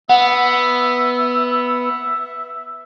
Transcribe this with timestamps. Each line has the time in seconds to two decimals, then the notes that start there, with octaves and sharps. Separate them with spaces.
0.10 B3 E5 F#5